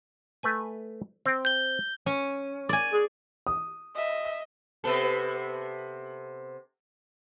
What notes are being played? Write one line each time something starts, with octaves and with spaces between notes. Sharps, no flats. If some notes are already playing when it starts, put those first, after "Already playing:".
A3 B4 G#5
C4 G5
G6 G7
C#4
D5 G#5
G#4
D#6
D#5 E5
C3 B3 A4